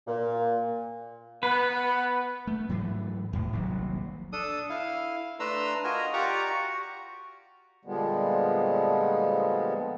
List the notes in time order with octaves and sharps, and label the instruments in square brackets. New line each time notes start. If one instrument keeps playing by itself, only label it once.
[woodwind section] A#2
[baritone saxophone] B3 [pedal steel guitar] B4
[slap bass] A3
G#2 E3 F#3 A3
E2 A2
D#1 A#1 C3 F#3
[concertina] D4 A4 D#6
E4 F5
A3 D4 B4 A#5 C6 E6
F4 F#4 A#4 D#5 G#5 A#5
F4 G4 D5 F#5 A#5 C#6
F#4
[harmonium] A#2 D3 F3 G3 G#3 B3